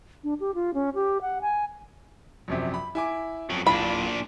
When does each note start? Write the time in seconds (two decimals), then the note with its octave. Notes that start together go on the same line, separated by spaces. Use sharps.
0.24 D4
0.40 G4
0.55 F4
0.74 C#4
0.95 G4
1.21 F#5
1.42 G#5
2.48 A#1 F#2 C3
2.74 B5
2.95 E4 G#5 D6
3.50 F2 F#3
3.67 D1 A#2 D4 F4 B5